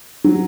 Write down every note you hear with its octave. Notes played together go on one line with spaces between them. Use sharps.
F#3